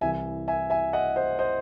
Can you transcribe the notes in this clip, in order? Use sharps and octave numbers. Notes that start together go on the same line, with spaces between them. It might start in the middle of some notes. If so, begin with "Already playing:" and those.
C2 C3 E3 E5 G#5
E5 G#5
E5 G#5
D#5 F#5
C5 D#5
C5 D#5